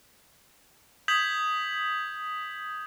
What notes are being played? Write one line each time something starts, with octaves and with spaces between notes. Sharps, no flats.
D#6 G6 G#6 B6 F#7